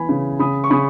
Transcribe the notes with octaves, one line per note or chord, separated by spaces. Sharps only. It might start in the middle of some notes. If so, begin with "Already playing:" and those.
Already playing: E3 B3 G#5 B5
C#3
C#3 B5 D#6
C#6
C#3 B5 D#6